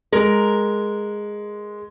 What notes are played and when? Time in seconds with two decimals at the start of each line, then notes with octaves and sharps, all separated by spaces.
0.13 G#3 A#4